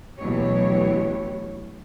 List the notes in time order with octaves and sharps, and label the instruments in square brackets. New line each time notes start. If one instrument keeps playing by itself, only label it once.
[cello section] D2 B2 E3 F#3 G4 C#5